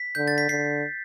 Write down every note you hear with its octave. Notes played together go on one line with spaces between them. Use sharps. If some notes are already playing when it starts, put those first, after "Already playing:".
Already playing: B6
D3 G6
A6
B6
D3 C7